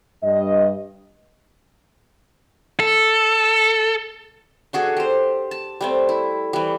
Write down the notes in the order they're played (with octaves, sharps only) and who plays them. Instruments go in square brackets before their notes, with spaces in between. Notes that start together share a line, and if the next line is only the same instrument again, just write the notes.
[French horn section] G2 D#5
[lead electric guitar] A4
[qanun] D4 F#4 G#4 A4
G4 C5
A5
G3 A3 C4
E4
E3 G3